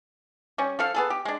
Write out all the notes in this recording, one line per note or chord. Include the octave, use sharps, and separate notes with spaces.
G3 C#4
F3 A4 F5
B3 G#4 A4
G4
G#3 D4